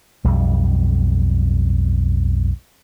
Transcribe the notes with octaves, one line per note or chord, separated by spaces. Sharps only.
B1 F2 G3